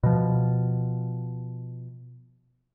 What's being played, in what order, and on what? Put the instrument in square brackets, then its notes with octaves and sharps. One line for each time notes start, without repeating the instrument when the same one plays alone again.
[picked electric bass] B2 F3